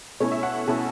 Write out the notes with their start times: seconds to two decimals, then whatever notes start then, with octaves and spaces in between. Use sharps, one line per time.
0.20 B2 A3 C#4 E4 C#5
0.31 E5
0.43 F#5
0.67 B2 A3 C#4 E4 A5